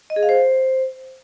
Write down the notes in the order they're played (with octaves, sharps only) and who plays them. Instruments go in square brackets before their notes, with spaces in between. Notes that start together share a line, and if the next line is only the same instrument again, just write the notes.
[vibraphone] D#5
G#4
F5
C5